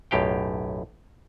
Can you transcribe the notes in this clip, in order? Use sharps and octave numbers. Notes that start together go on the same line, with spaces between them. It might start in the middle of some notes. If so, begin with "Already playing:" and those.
B1 F#2 A2 G4 F5 G5